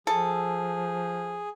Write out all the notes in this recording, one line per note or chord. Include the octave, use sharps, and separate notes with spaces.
F3 G#4 A4